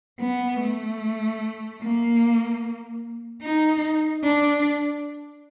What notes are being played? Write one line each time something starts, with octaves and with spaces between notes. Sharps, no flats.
B3
A3
A#3
D#4
D4